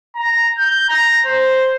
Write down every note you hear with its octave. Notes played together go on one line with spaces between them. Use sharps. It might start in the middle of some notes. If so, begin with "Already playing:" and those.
A#5
G6
A#5
C5